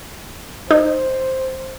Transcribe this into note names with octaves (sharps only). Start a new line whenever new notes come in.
D#4 C5